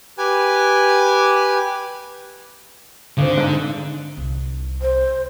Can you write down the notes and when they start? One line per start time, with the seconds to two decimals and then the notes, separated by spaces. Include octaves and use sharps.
0.18 G4 B4 G#5
3.18 G#1 D3 C4
3.37 G#2
4.17 C2
4.82 C5